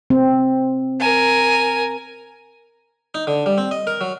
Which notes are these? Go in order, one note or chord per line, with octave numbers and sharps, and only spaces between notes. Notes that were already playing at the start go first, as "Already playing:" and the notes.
C4
A#4 G#5
D#4
D3
G3
C4
D#5
A#4
F#3